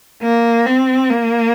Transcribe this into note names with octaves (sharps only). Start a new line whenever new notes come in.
A#3
C4
A#3